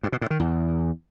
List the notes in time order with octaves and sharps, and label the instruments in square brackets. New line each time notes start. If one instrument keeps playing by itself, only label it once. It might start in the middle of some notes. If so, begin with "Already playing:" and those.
[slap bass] G2
B2
A2
D#3
E2